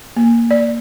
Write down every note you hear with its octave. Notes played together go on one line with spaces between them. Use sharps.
A#3
D5